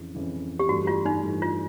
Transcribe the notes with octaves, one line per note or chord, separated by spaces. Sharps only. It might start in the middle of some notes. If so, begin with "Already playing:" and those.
Already playing: F2 C#3 E3
F2 C#3 E3
G4
G2 E3 A3 F#4
F4
D#4
G2 E3 A3
F4